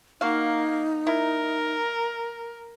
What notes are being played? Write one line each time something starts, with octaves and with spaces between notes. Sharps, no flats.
A#3 D#4 F#4 F5
E4 A#4